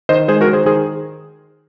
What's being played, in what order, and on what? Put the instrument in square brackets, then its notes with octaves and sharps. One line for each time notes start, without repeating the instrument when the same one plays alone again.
[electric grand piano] D#3 C5 D#5
G#3 G#4 C5
F#4 A#4
D#3
G#4 C5
D#3 G#4 C5